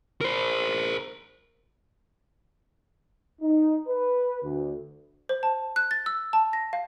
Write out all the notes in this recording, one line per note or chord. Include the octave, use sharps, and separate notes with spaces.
A#4 C5
D#4
B4
D2
C5
A5
F#6
A6
E6
A5
A#6
F5